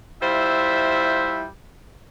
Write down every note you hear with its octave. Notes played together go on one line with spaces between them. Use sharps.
G3 E4 F4 C5 E5